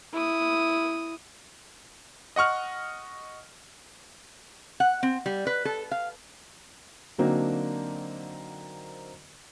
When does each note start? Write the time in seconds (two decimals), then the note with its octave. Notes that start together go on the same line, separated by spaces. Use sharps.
0.13 E4 D#6
2.36 D#5 F#5 C#6 F6
4.80 F#5
5.03 C4
5.26 G3
5.47 B4
5.65 A4
5.91 F5
7.18 D3 F#3 A#3 C4 D4 D#4